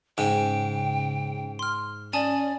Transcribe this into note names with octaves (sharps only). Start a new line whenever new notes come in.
G#2 C#3 G5
C6 F6
C#4 D5 G#5 A5 D#6